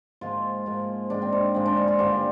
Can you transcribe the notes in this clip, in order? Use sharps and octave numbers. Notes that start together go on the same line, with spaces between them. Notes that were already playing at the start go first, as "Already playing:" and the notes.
G#2 F3 A#3 F4
G#2 F3 A#3
G#2 F3 G#3 D4
C4
D4
G#2 F3 G#3 C4
D4
D#4
F4
G2 D3 G3 A#3 D4